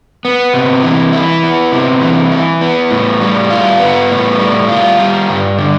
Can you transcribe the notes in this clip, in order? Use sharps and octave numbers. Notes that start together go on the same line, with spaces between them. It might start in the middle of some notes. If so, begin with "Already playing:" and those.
B3
C3
E3
E4
B3
C3
E3
E4
B3
A2
G3
F4
B3
A2
G3
F4
G3
G2
D3